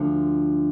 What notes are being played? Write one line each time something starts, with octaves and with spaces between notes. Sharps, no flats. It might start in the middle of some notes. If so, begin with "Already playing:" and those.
Already playing: D2 D3 F3